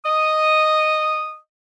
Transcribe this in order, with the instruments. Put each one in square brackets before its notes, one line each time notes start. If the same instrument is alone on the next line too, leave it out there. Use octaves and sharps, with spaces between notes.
[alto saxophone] D#5 [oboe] D#6